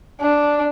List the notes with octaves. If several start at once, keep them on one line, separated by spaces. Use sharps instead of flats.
D4